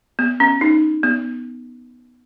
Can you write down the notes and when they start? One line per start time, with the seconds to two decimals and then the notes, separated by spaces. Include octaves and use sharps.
0.19 B3
0.40 C#4
0.61 D#4
1.03 B3